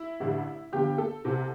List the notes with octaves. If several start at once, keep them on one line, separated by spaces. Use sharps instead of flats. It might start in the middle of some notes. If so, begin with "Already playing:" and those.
Already playing: E4
A1 G2 D3
G1 G2 D3 G4
A4
C2 C3 E3